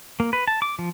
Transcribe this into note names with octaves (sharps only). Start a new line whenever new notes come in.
A#3
B4
A5
D6
F3